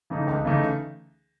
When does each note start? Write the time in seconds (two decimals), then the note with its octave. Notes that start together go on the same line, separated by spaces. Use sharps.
0.10 C#3 E3 A3 D#4
0.27 C#2
0.45 C#3 E3 A3 D#4